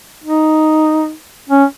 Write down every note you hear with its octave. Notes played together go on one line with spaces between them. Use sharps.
D#4
C#4